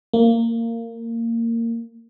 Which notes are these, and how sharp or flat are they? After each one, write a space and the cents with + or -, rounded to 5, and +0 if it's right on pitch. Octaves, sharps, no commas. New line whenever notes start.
A#3 -20